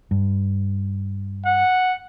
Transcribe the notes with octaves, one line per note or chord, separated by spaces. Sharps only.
G2
F#5